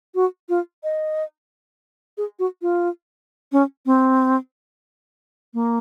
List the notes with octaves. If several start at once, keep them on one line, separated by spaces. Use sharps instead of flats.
F#4
F4
D#5
G#4
F#4
F4
C#4
C4
A#3